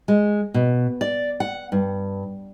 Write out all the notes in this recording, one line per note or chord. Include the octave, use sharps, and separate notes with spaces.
G#3
B2
D5
F#5
G2